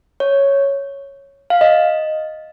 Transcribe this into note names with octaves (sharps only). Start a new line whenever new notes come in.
C#5
F5
D#5